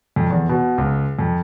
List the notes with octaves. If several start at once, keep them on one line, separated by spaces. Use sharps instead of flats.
F2
E2
B2
C#2
F2